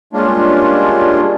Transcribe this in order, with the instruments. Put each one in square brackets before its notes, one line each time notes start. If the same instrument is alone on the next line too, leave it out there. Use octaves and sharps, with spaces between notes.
[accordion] G3 G#3 A#3 C#4 D4 F4